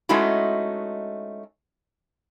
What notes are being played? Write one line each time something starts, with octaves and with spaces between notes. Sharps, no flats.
G#3 A3 C#4 D#4 E4 F#4